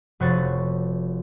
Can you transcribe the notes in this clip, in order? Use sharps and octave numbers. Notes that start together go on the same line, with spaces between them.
F1 B3 F#4 C5 C#5 A6